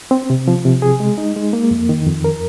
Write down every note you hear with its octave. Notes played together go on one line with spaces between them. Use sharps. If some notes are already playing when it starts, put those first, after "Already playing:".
C4
C3
F3
C3
G#4
G#3
D#4
G#3
A#3
F2
D#3
F2
A#4